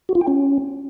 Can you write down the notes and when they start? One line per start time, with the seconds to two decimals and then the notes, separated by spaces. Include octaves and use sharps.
0.09 F#4
0.15 F4
0.21 G5
0.27 C#4